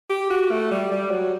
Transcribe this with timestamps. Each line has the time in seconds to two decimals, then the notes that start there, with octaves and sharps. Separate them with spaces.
0.10 G4
0.30 F#4
0.51 A3
0.71 G3
0.92 G3
1.11 F#3